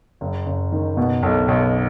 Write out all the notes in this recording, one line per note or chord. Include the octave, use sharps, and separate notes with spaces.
F#1
F#1
D#3
B2
B1
B1